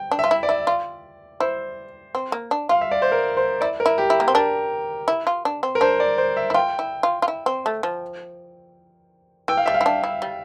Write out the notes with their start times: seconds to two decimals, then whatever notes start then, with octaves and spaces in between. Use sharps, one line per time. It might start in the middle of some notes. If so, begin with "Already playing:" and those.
Already playing: G5
0.11 D4
0.19 E5
0.24 F4
0.31 E4
0.43 D5
0.49 E4
0.67 F4
1.40 E4 C5
2.15 C4
2.32 A#3
2.51 D4
2.69 F4 F5
2.81 E5
2.91 D5
3.02 C5
3.12 A#4
3.37 C5
3.61 E4 D5
3.80 A#4
3.86 E4
3.98 G4
4.10 E4
4.20 A#3
4.28 C4
4.34 D4 A#4
5.08 E4
5.27 F4
5.45 D4
5.63 C4
5.75 A#4
5.81 D4 C5
6.00 D5
6.18 C5
6.37 E5
6.50 E4
6.54 F4 G5
6.79 E4
7.03 F4
7.22 F4
7.28 E4
7.46 C4
7.66 A3
7.83 F3
9.48 E3 G5
9.57 F5
9.66 G3 E5
9.74 F5
9.81 E4
9.86 D4
10.04 E4
10.22 G3